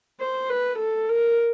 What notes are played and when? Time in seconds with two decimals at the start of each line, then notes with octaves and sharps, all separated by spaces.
0.20 C5
0.50 B4
0.79 A4
1.09 A#4